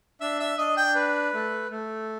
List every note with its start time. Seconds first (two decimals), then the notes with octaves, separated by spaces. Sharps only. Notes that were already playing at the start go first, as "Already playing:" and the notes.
0.21 D4 E5
0.40 E5
0.58 D4 D#5
0.77 G5
0.95 B4
1.34 A3
1.70 A3